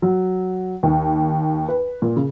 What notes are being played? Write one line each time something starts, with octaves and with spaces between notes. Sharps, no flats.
F#3
D#2
B4
A#2
C#3